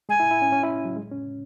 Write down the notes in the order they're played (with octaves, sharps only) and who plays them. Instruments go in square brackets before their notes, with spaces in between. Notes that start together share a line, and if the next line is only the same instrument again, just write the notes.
[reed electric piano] G#3 [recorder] G#5
[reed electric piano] E4
E4
C#4
C#4
E4
F#3
G#3
C#4